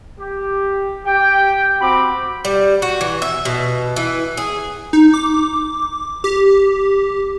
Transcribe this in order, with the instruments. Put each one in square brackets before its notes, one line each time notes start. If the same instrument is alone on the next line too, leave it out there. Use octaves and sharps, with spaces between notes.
[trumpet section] G4
G4 G5
C4 F#4 B5 D6
[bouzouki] G3
F#4
E3
E5
B2
E3
G#4
[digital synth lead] D#4
D6
G4